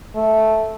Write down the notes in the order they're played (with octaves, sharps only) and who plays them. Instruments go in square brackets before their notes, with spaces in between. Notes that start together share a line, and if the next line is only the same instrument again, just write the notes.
[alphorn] A3